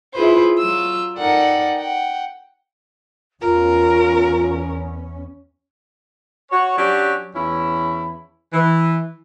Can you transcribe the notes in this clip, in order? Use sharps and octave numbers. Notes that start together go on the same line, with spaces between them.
E4 F4 G#4 B4 C5
F#3 F4 E6
D#4 A4 A#4 D5 F#5 G5
F#5 G5
E2 C#4 F4 A#4
F#4 C#5
F#3 C#4 D4 F#4 G4
E2 C#4 E4
E3